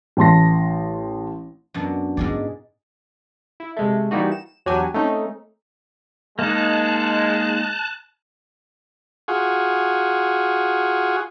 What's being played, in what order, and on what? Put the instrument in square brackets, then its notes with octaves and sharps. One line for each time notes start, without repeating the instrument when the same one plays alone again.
[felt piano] A1 A5 C6 A#6
[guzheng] F#2 B2 D4
[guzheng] G#2 G#4 D5 [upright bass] B3 E4
[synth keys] E4
C3 G#3 A3
E3 G3 A#3 D#4 F#4
E7
E2 F#3 D4 G4 G#5
A3 C4 C#4 D#4
[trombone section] G#3 [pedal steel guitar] A#3 D#4 [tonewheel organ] A5 F#6
[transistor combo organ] F4 F#4 G#4